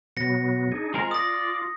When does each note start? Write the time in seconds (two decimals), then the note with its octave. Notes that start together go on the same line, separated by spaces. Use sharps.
0.17 B2 F#3 B3 A#6 C#7
0.72 D4 D#4 G#4
0.94 G#3 C4 F4 A#4
1.11 D5 D#6 A#6